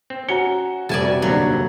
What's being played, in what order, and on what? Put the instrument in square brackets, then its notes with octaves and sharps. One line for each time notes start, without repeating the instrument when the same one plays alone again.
[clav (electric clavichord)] C4
[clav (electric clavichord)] C#4 [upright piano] F#4 G7 [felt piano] A#5 C#7
[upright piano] F1 G3 A3 [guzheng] D5 G#5 A5
[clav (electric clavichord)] B2 [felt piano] C4 F#4
[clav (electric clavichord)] A#1 D#2 D3 [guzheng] F#3